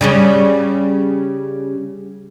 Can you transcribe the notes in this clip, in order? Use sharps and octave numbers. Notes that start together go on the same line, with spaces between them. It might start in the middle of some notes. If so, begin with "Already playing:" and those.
C#3 G3 C#4